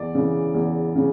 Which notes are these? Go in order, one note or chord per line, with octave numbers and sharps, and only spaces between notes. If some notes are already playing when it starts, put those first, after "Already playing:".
Already playing: E2 D5
C#3 E3
E2
C#3